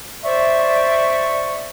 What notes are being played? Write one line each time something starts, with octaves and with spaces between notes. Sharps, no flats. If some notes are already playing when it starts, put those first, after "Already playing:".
C5 D5 E5 C#6